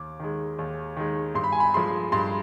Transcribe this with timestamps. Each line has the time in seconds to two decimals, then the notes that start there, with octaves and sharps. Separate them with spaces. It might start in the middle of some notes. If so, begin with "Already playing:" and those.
Already playing: D#2 D6
0.20 D#3 G#3
0.59 D#2
0.97 D#3 G#3
1.35 G2 C6
1.44 B5
1.52 G#5
1.60 B5
1.74 F3 G#3 C6
2.12 G2 C6